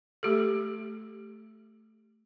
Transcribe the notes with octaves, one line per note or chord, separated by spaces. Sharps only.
A3 G4 A4